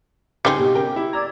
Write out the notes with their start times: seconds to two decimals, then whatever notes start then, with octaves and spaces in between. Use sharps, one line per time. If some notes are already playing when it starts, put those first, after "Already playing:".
0.45 C#2 G3 C4 D#4 G#5
0.59 B2 G4
0.74 C#3 A#4 G5
0.96 E4
1.13 D5 A#5 D6 E6 G#6